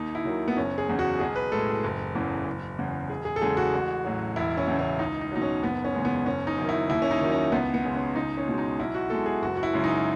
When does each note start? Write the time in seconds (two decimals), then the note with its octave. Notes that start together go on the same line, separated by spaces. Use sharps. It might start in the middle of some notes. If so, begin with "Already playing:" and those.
Already playing: D#2 D#4
0.15 E4
0.25 D#3 F#3
0.48 B3
0.57 F#1 C#4
0.78 G#4
0.89 E2 C#3
0.99 F#4
1.20 B1 G#4
1.36 B4
1.52 A2 G#3 A4
1.84 F#1
2.15 E2 C#3 E3
2.47 F#1
2.79 E2 C#3
3.10 E1 G#4
3.25 G#4
3.36 A4
3.41 E2 C#3 G#3 G#4
3.57 F#4
3.73 A1
4.05 A2 F#3
4.36 E1 E4
4.57 C#4
4.67 E2 C#3
4.79 C#4
4.99 C#2 D#4
5.21 D#4
5.32 B2 F#3 D#4
5.42 C#4
5.62 F#1 B3
5.84 C#4
5.94 E2 C#3 G#3
6.05 B3
6.26 F#1 C#4
6.47 D#4
6.57 F#2 D#3
6.69 E4
6.90 D#2 E4
7.02 C#4
7.11 D#4
7.21 D#3 F#3
7.31 C#4
7.52 C#2 B3
7.74 B3
7.84 C#3 G#3
7.95 C#4
8.16 C#2 D#4
8.37 C#4
8.48 B2 G#3
8.58 D#4
8.80 B1 E4
8.95 F#4
9.10 B2 G#3 A4
9.26 G#4
9.42 F#1 F#4
9.57 F#4
9.63 E4
9.73 F#2 C#3 G#3
9.84 D#4